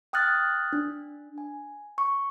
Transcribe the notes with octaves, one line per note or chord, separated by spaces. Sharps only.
G5 D#6 F6 F#6 A6
D4
G#5
C#6